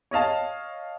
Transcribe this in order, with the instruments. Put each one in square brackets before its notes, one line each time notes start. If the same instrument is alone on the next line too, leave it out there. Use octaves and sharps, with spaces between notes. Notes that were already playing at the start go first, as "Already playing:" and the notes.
[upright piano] C#5 D#5 F5 A5